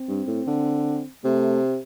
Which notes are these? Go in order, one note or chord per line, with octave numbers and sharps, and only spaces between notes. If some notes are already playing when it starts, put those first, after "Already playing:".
Already playing: C4
G2
A2
D3
C3 A3